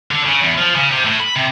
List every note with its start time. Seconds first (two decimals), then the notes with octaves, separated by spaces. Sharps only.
0.11 D3
0.25 C#3
0.41 E2
0.58 F3
0.75 C#3
0.91 C3
1.05 A2
1.20 B5
1.36 C3